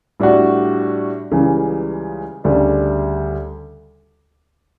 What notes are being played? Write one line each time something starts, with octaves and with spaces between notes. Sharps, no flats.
A2 G3 D4 F#4
C#2 C#3 E3 G3
D2 C#3 G3 D4